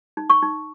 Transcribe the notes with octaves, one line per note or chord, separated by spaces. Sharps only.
D#4
C#6
D#4